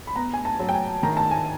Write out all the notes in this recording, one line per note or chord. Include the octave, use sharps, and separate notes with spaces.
B5
B3 A#5
G#5
A5
F#3
G5
G#5
D#3 A#5
A5
G#5